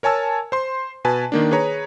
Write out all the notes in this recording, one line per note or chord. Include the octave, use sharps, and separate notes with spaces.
A#4 C#5 G#5 A5 E6
C5 C6
B2 B4 G#5 A5
D#3 A#3 D4
G#4 B4 C#5 A#5